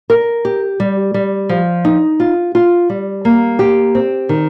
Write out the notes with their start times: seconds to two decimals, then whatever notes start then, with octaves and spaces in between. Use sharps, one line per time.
0.10 A#4
0.45 G4
0.80 G3
1.14 G3
1.49 F3
1.85 D#4
2.20 F4
2.55 F4
2.90 G3
3.25 A#3
3.59 G4
3.95 C4
4.29 D#3